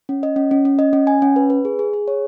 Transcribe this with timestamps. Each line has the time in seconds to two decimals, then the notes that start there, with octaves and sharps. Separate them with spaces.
0.09 C#4
0.23 D#5
0.36 C#4
0.51 C#4
0.65 C#4
0.79 D#5
0.93 C#4
1.07 G#5
1.22 C#4
1.36 B4
1.50 B4
1.65 G#4
1.79 G#4
1.93 G#4
2.08 C#5